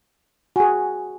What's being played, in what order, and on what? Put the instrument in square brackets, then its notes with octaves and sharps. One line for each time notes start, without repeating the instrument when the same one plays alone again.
[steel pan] F#4 G#4 [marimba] G#5